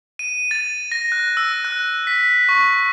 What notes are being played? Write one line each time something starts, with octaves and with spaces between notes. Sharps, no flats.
D#7
A6
A#6
F#6
E6
F#6
B6
C#6